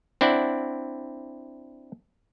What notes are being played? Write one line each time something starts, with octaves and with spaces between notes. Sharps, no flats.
C4 D4 E4 D5 F#5